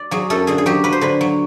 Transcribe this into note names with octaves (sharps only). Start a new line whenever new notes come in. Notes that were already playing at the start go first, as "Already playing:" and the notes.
Already playing: D5
F#3 G#4
F#2 A4
D3 G#4
G#4
F#3 G4
F#3 B4
C5
D3 B4
F#3